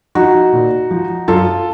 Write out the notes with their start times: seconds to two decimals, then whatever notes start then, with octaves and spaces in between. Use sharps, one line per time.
0.15 F3 D#4 F#4
0.53 A#2
0.91 F3
1.28 F#2 F4 A4